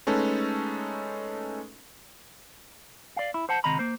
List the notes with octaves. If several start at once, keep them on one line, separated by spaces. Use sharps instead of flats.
G#3 A3 C#4 D#4 A4 B4
D5 F5
E4
C5 F#5 A5
C#2 C3 D#3 D#5 A#5 B5
A#3 C5